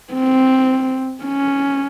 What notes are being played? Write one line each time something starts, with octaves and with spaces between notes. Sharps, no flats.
C4
C#4